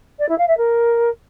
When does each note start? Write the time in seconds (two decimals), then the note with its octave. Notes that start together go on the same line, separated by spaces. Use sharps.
0.19 D5
0.29 E4
0.38 F5
0.48 E5
0.57 A#4